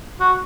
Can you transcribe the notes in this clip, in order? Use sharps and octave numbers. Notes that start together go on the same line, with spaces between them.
F#4